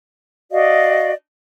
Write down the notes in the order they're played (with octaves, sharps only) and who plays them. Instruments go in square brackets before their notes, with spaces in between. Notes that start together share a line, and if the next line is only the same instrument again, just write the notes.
[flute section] F#4 D5 D#5 F5